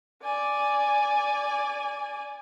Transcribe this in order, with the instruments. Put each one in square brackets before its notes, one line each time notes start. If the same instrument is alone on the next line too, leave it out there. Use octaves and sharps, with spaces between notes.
[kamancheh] D5 G#5